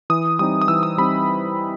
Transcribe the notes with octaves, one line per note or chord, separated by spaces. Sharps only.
E3 D#6
G3 C4 D#4 D#6
D#6
E3 E6
D#6
G3 C4 D#4 B5